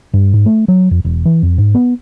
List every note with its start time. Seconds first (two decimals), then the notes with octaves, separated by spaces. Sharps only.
0.13 G2
0.34 G#2
0.46 A3
0.68 F#3
0.91 F2
1.05 E1
1.25 E3
1.43 F2
1.58 G#2
1.75 B3